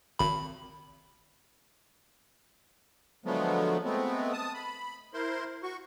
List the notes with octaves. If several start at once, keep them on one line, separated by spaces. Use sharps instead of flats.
G#1 B5
D3 F3 F#3 G#3 A3 B3
G#3 A3 B3 C4
A5 D#6
B5
E4 A#4 C5 C6
F#4 C#6